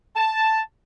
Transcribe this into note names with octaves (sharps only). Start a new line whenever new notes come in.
A5